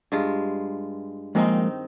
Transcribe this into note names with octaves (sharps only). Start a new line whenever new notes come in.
G2 G#3 F4
D#3 F3 G#3 A#3 C4 D#4